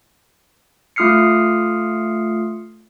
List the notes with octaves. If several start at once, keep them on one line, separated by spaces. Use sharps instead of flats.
A3 F4 D#6 F6 C7 C#7